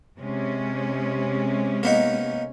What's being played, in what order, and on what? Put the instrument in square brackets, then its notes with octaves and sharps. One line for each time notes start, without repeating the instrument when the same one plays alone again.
[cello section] C3 G#3 C#4
[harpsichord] A#3 B3 D#4